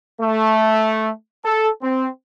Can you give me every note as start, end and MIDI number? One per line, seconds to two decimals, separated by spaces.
0.20 1.11 57
1.45 1.68 69
1.82 2.07 60